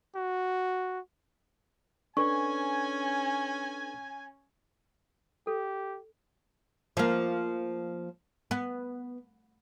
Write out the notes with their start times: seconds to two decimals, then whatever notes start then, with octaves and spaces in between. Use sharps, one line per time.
0.15 F#4
2.17 C#4 D4 A4 B4 G#5 C#6
5.47 G4 A4
6.97 F3 A#3
8.51 B3